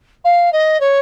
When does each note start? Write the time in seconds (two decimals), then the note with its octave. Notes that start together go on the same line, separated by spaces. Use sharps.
0.24 F5
0.52 D#5
0.80 C#5